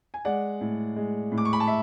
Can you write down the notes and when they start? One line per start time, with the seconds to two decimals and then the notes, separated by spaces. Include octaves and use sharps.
0.14 G#5
0.25 G#3 D5 F#5
0.61 A2
0.96 G#3
1.32 A2
1.38 D6
1.45 C#6
1.53 B5
1.60 A5
1.67 E5